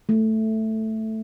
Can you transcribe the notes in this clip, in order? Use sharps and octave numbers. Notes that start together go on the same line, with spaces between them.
A3